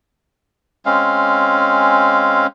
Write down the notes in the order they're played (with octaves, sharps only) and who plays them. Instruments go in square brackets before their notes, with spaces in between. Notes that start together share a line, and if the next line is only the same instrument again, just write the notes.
[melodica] G#3 C4 C#4 F5